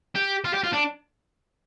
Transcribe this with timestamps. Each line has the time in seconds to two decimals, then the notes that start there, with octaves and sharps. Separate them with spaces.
0.15 G4
0.45 F4
0.54 G4
0.64 F4
0.73 D4